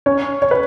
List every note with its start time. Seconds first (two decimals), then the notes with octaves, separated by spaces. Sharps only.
0.06 C#4 C#5
0.42 C#5
0.51 B4